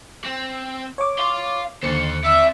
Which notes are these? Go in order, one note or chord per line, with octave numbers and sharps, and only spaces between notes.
C4
C#5 D6
F5 C6
D#2 D3 A4 C5 C#7
C4 D5 E5